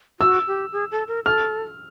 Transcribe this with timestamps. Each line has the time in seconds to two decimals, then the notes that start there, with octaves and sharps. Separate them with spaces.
0.20 F#4 E6
0.47 G4
0.72 G#4
0.91 A4
1.08 A#4
1.25 A4 F6